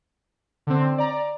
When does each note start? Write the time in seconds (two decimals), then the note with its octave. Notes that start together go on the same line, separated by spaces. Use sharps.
0.67 D3 C4
0.98 D5 A#5